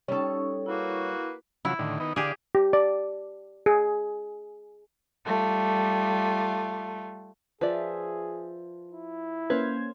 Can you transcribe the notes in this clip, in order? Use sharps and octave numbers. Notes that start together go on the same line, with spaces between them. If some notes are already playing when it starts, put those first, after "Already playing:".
G3 C#4 D#4 A4 C#5 C#6
A#3 E4 F#4 B4 C#6
C#3 F3 F#3 E4
A2 D3 D#3
D#3 B3 D#4
D3 G4 G#4 D5 F5
G4
D5
G#4
G3 A3 F4
F3 G#4 B4 D5 E5
E4
A#3 C#4 B4 C5 F5 G#6